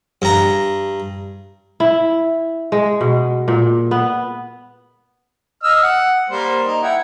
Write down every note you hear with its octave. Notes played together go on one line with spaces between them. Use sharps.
G2 A#5
E4
G#3
B2
A#2
B3
D#5 E6 F6
F#5
G3 A#3 C5
D#4
E4 F#5 G5